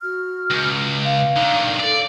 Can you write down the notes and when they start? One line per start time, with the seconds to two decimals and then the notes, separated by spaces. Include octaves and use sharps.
0.02 F#4 F6
0.50 C#2
1.03 F5
1.36 D3 D#3
1.80 A4 D5 F5